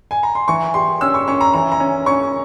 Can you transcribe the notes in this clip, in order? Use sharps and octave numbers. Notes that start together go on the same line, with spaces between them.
G#5
A#5
C6
E3 C#6
G4 C6
C#4 E6
C#6
C#4 C#6
A#5
E3 A#5
A#5
C#4
C#4 C#6